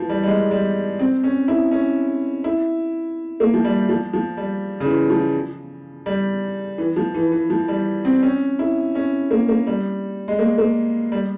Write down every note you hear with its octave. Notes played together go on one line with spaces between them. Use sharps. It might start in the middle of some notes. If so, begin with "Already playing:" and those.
Already playing: E3 F3
G3
G3
G#3
G3
C4
C#4
E4
C#4
E4
A#3
F3
G3
F3
F3
G3
C#3
E3
F3
G3
E3
F3
E3
E3
F3
G3
C4
C#4
E4
C#4
A#3
A#3
G3
G#3
A#3
A#3
G3